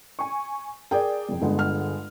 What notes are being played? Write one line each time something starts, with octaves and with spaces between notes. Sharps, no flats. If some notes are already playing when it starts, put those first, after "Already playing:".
G#5 C#6
G#4 A#4 D5 G5
C2 F2
G1 G#3 F#5
F6